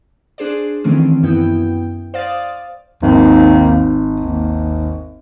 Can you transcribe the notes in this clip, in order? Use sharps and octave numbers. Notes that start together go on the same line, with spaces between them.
D4 G#4 C5 D5
D#3 E3 A3 C4 C#4
F#2 B3 E4 G5
C5 D5 F5 D#6 A6
G#1 D#2
D#2